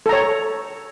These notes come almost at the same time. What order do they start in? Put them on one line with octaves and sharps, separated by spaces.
A4 A#5 C#5